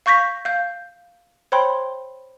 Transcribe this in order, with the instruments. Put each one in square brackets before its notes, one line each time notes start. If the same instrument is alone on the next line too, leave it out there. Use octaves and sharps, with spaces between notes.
[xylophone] F5 C#6 G6 A#6 B6
F5 G6
C5 C#5 G5 B5 C6